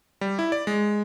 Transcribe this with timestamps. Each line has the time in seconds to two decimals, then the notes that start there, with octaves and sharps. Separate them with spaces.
0.21 G3
0.39 E4
0.52 D5
0.67 G#3